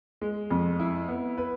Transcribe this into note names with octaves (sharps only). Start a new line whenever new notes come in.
G#3
F2
E4
B3
B4